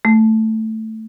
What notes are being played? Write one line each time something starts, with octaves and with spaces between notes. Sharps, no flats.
A3